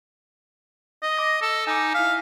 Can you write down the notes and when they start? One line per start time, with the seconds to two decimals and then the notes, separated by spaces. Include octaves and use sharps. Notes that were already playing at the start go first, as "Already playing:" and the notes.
1.03 D#5
1.18 D6 A#6
1.42 A4
1.67 D#4 G#5 D6
1.95 E4 F5 B6